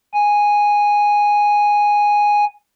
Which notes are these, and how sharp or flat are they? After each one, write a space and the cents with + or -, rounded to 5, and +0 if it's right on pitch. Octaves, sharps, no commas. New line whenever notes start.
G#5 -5